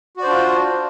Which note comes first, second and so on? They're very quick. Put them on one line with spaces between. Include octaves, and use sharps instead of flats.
F#4 D5 C5 D4 F4